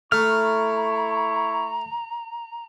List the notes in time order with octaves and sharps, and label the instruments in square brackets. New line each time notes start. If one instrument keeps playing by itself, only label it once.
[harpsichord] A3 [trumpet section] E4 C#6 [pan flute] A#5 [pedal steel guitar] F6